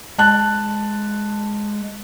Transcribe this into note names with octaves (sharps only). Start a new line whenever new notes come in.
G#3 A5 F#6